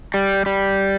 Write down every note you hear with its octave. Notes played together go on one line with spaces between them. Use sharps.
G3
G3